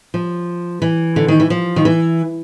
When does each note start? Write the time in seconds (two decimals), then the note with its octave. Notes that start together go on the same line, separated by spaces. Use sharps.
0.14 F3
0.82 E3
1.16 D3
1.28 D#3
1.40 E3
1.50 F3
1.76 D#3
1.85 E3